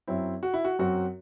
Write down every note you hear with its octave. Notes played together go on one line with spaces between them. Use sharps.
F#2 F#3 C4 E4
F#4
E4
F#4
F#2 F#3 C4 F#4